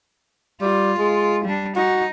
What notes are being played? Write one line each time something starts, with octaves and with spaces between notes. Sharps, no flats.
G3 F4
G#3
G3 D4
D#4 F#4